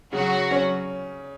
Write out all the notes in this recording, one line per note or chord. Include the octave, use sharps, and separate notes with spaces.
C#3 F#3 F#4
C#4